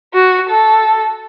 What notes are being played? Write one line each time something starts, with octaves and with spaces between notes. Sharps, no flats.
F#4
A4